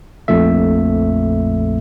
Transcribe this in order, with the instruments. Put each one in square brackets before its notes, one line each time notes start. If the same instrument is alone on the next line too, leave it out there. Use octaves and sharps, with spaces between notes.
[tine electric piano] A#1 F2 A#2 A3 E5